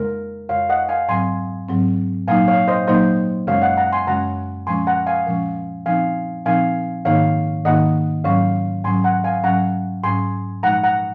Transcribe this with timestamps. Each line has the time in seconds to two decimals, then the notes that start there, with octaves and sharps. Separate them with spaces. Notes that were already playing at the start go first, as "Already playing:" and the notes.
Already playing: F2 C#3 G#3 A#4
0.49 F2 C#3 G#3 C#5 F5
0.69 D#5 F#5
0.89 F5 G#5
1.08 G#2 F#3 C4 G#5 C6
1.68 G#2 F#3 C4
2.28 A#2 F#3 A#3 D#4 F5 G#5
2.48 C#5 F5
2.68 C5 D#5
2.87 A#2 F#3 A#3 D#4 C5 D#5
3.47 F#2 C#3 G#3 C#4 C#5 F5
3.62 D#5 F#5
3.77 F#5 A#5
3.92 G#5 C6
4.07 F#2 C#3 G#3 C#4 F#5 A#5
4.67 A#2 F3 G#3 C#4 G#5 C6
4.87 F#5 A#5
5.07 F5 G#5
5.26 A#2 F3 G#3 C#4
5.86 A#2 F3 C4 D#4 F5 G#5
6.46 A#2 F3 C4 D#4 F5 G#5
7.05 G#2 D#3 A#3 D#4 C#5 F5
7.65 G#2 D#3 A#3 D#4 D#5 F#5
8.24 G#2 F#3 C#4 C#5 F5
8.84 G#2 F#3 C#4 G#5 C6
9.04 F#5 A#5
9.24 F5 G#5
9.44 G#2 F#3 C#4 F#5 A#5
10.04 G#2 F#3 C#4 G#5 C6
10.63 A#2 F3 G#3 D#4 F#5 A#5
10.83 F#5 A#5